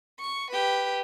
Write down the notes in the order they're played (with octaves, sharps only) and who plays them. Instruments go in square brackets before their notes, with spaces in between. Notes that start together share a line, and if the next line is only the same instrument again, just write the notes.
[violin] C#6
G4 B4